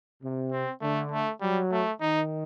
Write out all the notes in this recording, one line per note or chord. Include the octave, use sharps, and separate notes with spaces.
C3
C4
D3 A3
A3
F#3 G3
A3
D#3 D#4